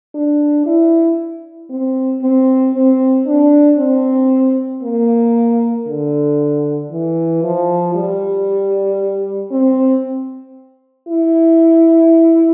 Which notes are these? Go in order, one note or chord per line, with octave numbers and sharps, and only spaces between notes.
D4
E4
C4
C4
C4
D4
C4
A#3
D3
E3
F3
G3
C4
E4